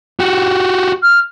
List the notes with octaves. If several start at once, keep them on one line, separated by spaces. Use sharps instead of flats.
F#4 G4
F6